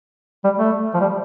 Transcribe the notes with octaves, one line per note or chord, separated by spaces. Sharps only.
G3
A3
F3
G3